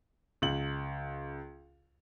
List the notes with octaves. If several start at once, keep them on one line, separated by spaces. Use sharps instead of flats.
C#2 F#7